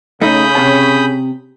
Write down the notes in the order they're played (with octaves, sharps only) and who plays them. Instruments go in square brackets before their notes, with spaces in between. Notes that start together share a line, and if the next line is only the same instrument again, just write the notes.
[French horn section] C#3 C#4 [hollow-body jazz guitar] A3 D#4 [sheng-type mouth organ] B5 D#6 G6
[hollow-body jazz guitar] C3 A5